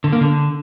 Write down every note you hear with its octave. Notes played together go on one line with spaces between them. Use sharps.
D3
A#3
D3